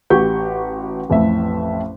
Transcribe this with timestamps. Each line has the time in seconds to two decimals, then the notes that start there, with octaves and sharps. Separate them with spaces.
0.10 A1 F#4 G4 C#6 G6
1.10 A1 F2 A2 E5